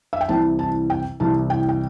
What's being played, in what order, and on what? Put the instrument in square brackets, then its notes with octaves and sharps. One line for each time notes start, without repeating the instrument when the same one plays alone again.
[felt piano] E5
G5
C2 C3 E3 C4 A5
A5
G5
C2 C3 E3 C4 A5
G5
G5